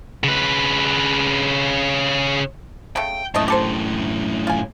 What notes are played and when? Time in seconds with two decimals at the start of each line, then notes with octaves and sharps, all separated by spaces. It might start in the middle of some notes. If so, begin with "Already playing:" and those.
0.24 C#3 B4
2.96 C#3 A3 G5
3.35 F#2 A2 A3 D#5
3.48 G4 A4 C5
4.47 F4 G#5